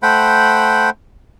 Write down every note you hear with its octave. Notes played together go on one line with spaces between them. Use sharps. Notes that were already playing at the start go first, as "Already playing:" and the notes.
A3 C5 F#5 G5 B5